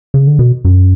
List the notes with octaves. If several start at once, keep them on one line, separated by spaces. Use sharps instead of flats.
C#3
D3
B2
F#2